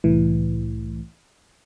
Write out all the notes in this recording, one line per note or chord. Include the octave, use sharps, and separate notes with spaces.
C2 A2 E3